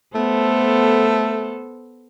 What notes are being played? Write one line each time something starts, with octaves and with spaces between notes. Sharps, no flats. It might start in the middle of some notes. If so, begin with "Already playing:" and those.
A3 B3 A4 C5